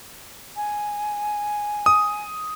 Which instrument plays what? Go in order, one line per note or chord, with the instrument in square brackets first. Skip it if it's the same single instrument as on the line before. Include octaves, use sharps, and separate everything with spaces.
[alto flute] G#5
[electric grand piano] D#6